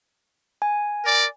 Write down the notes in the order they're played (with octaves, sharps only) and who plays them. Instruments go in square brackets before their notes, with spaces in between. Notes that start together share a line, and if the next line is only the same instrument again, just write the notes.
[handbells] G#5
[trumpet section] A#4 D5